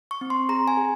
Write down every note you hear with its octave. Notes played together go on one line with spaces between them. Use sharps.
C#6
C4
C6
G#4 A#5
G#5
G#4